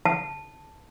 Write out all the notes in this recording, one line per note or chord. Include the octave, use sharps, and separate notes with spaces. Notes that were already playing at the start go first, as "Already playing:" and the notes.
A5